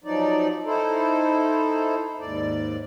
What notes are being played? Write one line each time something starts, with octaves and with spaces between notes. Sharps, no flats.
F3 F#3 D#4 D5
D#4 E4 A4 C5
D#2 G#2 D5